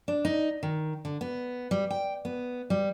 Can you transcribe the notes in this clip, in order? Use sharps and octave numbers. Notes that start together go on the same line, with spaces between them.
D4
D#4
D#3
D3
B3
G3
G5
B3
G3